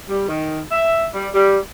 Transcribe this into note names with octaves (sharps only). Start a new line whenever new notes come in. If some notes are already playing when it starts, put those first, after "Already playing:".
G3
D#3
E5
G3
G3